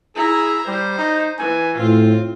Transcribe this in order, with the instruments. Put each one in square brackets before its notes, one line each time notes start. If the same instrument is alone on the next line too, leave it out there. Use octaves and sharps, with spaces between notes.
[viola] E4 A#5 [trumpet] G#4
[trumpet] G3 [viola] C5
[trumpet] D#4
[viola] E3 [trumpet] G#5
[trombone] A2 [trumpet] C4 [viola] F4